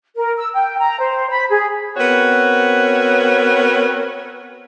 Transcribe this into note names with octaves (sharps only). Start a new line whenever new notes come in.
A#4
E6
G5
A#5
C5
B5
G#4
B3 C4 F#4 A#4 C#5